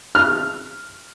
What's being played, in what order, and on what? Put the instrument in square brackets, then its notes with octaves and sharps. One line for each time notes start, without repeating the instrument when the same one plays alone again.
[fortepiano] F6